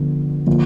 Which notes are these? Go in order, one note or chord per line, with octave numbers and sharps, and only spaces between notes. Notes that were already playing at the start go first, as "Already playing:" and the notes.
Already playing: D3 F3 B3
D3 F3 A#3